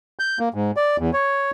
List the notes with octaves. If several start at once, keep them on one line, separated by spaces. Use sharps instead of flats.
G6
A#3
G#2
D5
E2
C#5